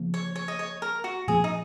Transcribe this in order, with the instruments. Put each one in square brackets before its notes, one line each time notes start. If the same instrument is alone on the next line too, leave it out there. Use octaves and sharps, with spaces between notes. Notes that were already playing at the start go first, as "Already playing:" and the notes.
Already playing: [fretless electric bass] C#3 F3 A#3
[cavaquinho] C#5
C#5
D#5
C#5
A#4
F#4
[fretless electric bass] A#2 F3 A#3 [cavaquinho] G#4
[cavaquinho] D#4